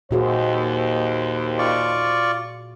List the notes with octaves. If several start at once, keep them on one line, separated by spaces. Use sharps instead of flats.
D#2 A#2 F#4 G#4 C5
F4 D5 C#6